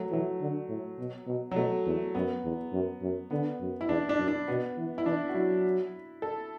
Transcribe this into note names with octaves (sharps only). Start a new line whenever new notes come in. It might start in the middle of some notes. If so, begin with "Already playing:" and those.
Already playing: F#3 A3
E3 F#3
D3
A2
B2
B2
F#3
B2 A3
E2
F#2 B3
E2
F#2
F#2
D3 B3
F#2
E4
E2 D4
D4
F#2
D4
B2 B3
E3
E4
E3 D4
F#4
F#3 E4
A4